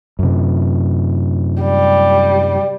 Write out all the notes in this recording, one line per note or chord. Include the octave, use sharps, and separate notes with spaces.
F#2 C3
G3